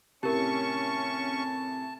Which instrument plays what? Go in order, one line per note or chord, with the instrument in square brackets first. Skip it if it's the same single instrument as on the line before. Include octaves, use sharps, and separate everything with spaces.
[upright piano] A2 C3 [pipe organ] C#4 C#6 [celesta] G4 A#4 [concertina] A5